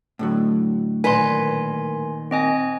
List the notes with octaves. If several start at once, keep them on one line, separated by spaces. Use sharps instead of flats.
A2 D3 F#3
A#2 D#3 B4 G#5 C6
C4 D#5 G#5